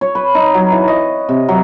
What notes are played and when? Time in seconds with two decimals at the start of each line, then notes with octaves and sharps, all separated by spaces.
0.01 C#5
0.15 B4
0.35 D#4
0.54 F#3
0.72 E3
0.88 D#5
1.29 C3
1.48 F#3